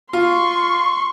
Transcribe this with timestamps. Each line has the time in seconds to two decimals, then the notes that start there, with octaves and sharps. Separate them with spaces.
0.13 F4 C6 C#6